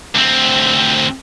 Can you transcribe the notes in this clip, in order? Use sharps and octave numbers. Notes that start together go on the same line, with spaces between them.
D2 C4